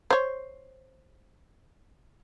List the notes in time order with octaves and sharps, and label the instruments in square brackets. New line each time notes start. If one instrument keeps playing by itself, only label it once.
[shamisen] C5 C#5